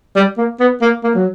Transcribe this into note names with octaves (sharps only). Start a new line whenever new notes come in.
G3
A#3
B3
A#3
A#3
F#3